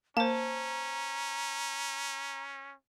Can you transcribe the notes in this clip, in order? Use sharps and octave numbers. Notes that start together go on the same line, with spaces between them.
A#3 C#4 C5 A5 A#5